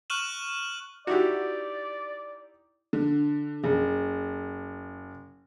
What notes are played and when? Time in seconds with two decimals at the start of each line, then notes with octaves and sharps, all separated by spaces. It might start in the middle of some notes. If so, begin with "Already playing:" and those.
0.10 C#6 F6 F#6 D#7 E7 F#7
1.07 D#4 E4 F#4 G4 D5
2.93 D3
3.64 F#1